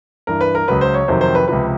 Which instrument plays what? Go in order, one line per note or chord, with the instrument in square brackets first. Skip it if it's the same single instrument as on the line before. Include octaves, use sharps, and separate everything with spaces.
[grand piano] G2 E3 A#4
B4
A#4
C#2 C#3 F#3 B4
C5
C#5
F2 C3 D#3 F#3 C5
C5
B4
C#2 C3 F3 B4